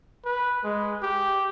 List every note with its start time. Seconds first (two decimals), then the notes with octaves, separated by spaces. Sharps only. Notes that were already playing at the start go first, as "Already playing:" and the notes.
0.25 B4
0.64 G#3
1.03 G4